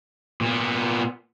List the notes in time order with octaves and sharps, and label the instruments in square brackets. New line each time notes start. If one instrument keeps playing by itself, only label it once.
[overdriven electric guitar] A#2 B3